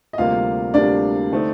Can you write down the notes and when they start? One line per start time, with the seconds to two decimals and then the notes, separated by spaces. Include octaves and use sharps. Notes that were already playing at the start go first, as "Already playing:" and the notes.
0.13 D#5
0.18 D2 C3 G3 A#3 F4 F5
0.74 D2 C3 G3 A#3 D4 D5
1.32 D3 A3 C4 D#4